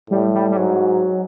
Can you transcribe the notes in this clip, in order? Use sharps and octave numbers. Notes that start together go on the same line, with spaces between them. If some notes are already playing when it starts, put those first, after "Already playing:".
A2 G3
G3
G3
G#2 F#3